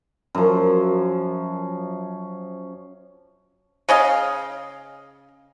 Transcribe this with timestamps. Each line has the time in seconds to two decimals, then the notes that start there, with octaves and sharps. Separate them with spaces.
0.35 F#2 F3
3.89 C#3 C#4 D#5 F5